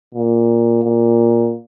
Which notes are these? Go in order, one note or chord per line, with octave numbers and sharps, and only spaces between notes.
A#2
A#2